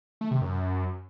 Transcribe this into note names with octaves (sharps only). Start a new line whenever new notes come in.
A3
C3
F#2